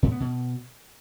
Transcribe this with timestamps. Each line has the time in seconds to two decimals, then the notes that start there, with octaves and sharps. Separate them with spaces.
0.03 A2
0.11 B3
0.20 B2